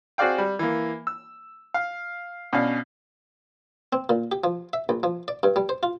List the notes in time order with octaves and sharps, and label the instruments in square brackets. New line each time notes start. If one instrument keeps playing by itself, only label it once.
[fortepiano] C4 F#4 G#4 D5 F5 G5
G3
E3 A#3
E6
F5
B2 C#4 D4 F5
[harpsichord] C4
A#2
G4
F3
E5
A#1
F3
D5
G2
G3
C5
F4